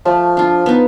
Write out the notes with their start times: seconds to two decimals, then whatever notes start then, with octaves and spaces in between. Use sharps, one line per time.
0.05 F3 A3
0.37 D4 F4
0.66 B3 D#4